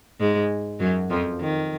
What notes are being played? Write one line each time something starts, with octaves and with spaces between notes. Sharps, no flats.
G#2 G#3
F#2 F#3
F2 F3
D#3